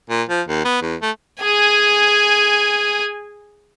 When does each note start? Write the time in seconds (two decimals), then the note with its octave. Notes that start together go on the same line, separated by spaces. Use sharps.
0.10 A#2
0.29 F3
0.48 D#2
0.64 B3
0.82 E2
1.02 A3
1.42 G#4 G#5